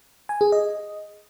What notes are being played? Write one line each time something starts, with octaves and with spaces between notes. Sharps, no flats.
G#5
G#4
D#5